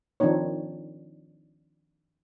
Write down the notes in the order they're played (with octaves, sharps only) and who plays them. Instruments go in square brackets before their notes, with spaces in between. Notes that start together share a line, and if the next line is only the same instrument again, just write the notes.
[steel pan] D#3 F3 C4 D4 D#4 C#5